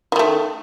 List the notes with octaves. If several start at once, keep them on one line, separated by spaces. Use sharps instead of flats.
D#3 E3 A3